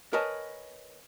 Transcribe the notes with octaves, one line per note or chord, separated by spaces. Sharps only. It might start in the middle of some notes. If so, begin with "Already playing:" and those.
A#4 B4 C#5 D#5 G#5 A5